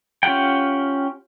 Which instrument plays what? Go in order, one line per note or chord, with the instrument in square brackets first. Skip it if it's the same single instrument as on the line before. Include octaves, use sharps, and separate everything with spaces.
[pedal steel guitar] C#4 F4 G4 F#5 G5